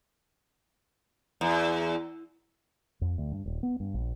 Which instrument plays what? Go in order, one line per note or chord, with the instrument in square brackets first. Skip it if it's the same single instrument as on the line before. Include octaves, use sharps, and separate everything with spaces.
[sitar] E2
[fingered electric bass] F2
D2
G2
D#1
B3
G2
A#1